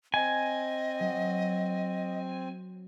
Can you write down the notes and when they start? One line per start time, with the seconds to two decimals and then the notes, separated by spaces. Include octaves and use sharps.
0.14 C4 D#5 G#5
1.00 F#3